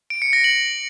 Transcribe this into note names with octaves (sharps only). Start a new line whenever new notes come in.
D7
C#7
A#6
F#7